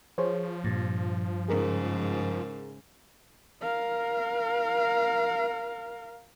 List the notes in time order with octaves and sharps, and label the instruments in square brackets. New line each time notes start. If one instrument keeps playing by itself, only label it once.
[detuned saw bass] F3 [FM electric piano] G#4 C5 C#5
[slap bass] G2 [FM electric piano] A#2
[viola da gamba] G#2 C#3 [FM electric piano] G#4 A#4
[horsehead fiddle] A#4 F5